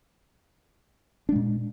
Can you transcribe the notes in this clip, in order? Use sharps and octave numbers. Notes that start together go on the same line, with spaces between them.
A#2 G#3 D4